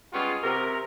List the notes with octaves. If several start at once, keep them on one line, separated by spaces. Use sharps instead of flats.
G3 G#3 B3 C#4 F4 G#4
C3 A#4